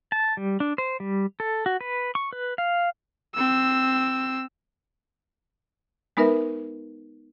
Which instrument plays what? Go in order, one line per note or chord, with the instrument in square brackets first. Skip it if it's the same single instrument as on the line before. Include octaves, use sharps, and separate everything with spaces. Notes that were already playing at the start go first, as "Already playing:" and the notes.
[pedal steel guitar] A5
G3
D4
C5
G3
A4
F#4
B4
C#6
B4
F5
[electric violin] C4 E6
[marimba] G#3 B3 D#4 A#4 B4 E5